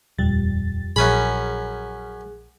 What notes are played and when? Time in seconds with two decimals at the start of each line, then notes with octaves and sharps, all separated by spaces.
0.18 D#1 F2 G3 A6
0.96 A#1 F#2 C#4 G#4 B5